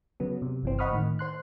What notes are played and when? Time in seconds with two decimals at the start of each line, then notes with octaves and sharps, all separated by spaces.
0.20 C#3 F#3 B3
0.42 C3
0.63 G1 E3 C4
0.79 D#5 F#5 B5 C#6 D#6 F6
0.92 A2 D#3
1.19 C5 C6 F#6